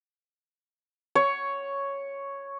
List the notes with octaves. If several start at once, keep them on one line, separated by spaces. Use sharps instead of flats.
C#5